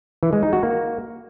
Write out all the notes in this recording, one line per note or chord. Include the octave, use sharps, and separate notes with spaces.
E3
G#3
D#4
F#4
A#3